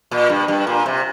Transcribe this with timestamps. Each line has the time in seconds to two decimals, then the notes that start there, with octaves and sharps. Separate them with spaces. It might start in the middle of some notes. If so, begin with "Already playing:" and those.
0.11 A#2
0.29 G2
0.48 G2
0.67 A#2
0.86 C3